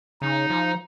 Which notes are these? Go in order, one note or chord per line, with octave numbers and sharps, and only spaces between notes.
C#3 D#4
F3